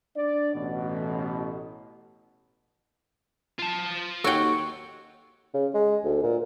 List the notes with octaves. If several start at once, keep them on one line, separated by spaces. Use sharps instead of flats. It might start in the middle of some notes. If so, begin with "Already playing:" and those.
D4 D5
A1 B2
F4 A5
D#2 F#4 A4 C#5 F#5 G5
C#3
G#3
D2
A#2